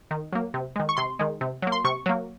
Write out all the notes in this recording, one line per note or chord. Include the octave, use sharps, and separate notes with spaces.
D#3
F#3 A#3
C3
D#3 G#3
C#6
C3 C6
D#3 G#3
C3
F#3 A#3
C6
C3 C#6
F#3 A#3